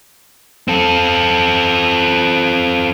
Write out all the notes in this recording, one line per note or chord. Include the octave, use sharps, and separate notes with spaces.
C4 A4